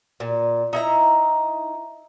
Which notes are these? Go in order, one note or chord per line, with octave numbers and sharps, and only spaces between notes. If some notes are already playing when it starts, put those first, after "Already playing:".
A#2
D#4 E4 A#5